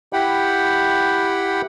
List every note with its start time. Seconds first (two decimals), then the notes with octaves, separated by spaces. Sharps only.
0.13 E4 G4 F#5 G5 B5